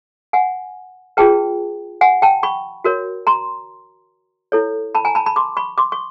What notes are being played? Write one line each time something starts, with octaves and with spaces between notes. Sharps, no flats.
F#5 G#5
F4 G#4 B4 G5 A5
F#5 G#5
G5 A5
B5 C#6
F#4 A#4 C#5
A#5 C6
E4 A4 C#5
A5 B5
G#5 A#5
A5 B5
A5 B5
C6 D6
B5 C#6
C6 D6
C#6